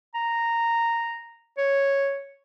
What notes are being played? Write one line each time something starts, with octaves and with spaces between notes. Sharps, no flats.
A#5
C#5